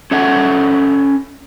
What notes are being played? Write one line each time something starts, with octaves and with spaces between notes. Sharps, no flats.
C#4 A4 E5 F#5